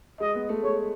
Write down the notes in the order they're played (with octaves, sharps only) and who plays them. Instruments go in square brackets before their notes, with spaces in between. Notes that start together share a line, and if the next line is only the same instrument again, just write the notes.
[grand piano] G#3 [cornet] D#5
[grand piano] B3
A3
[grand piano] G#3 [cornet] C#5